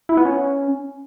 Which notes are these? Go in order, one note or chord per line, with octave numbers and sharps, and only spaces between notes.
E4
B3
C#4